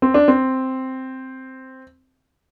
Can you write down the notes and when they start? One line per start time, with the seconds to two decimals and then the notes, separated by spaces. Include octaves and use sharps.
0.02 C4
0.14 D4
0.28 C4